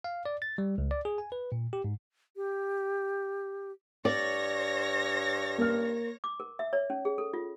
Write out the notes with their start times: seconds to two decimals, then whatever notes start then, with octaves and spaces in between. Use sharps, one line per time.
0.04 F5
0.26 D5
0.42 A6
0.58 G3
0.78 C#2
0.91 D5
1.05 G#4
1.18 G#5
1.32 B4
1.52 A#2
1.73 G4
1.84 G#2
2.36 G4
4.05 G2 C#5 D5 A#6
5.58 A#3 F6
6.24 D6
6.40 A#4
6.59 E5
6.73 C#5
6.90 C#4
7.05 G#4
7.18 A4
7.34 F4